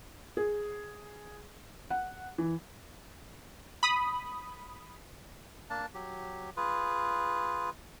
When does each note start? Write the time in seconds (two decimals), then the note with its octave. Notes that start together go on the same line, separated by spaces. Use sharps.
0.37 G#4
1.90 F#5
2.38 E3
3.83 B5 D#6
5.70 A#3 D4 A5
5.94 F#3 G4
6.57 F4 G#4 B4